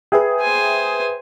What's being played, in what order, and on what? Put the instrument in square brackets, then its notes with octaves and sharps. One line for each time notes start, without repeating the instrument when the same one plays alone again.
[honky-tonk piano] G#4 [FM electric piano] B4 E5 G5
[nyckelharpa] C5 G#5